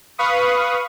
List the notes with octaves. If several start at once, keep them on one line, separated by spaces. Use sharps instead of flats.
B4 F5 B5 C#6 D#6